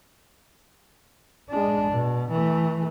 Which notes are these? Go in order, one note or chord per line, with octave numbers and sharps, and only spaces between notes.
G#3 D4
B2
E3 A3